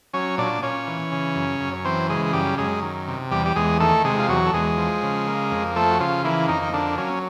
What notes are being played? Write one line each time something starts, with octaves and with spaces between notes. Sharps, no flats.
F#3 C#4 C#5
A#2 D4 D5
A#2 C#4 C#5
E3
C#3
F#2
F#2
C#5
E3 C4 C5
C#3 G#3 G#4
G#4
F#2 G3 G4
F#2 G#3 G#4
D#3
C3
E2 G3 G4
G4
E2 G#3 G#4
D#3 A3 A4
C3 G#3 G#4
F4
E2 F#3 F#4
A4
E2 G#3 G#4
F3
C#3
A#3
F2
F3 A3 A4
F#4
C#3 F3 F4
E3 A#3 E4
F2 D#3 D#4
D#4
D3 A#3 D4
F#3 C#4